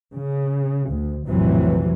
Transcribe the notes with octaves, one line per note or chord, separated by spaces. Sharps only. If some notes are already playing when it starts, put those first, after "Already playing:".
C#3
D2
A#1 F2 A2 C3 E3 F#3